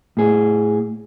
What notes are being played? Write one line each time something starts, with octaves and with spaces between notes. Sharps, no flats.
A2 G#4